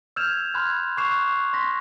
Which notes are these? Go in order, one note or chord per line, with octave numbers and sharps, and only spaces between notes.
E6 F6 G6 G#6 E7 F7
B5 C6 F6 F#6 G#6
C#6 D6 F#6 C7 E7 F7
C6 A#6 B6